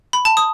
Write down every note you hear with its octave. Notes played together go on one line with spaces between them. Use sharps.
B5
A5
D#6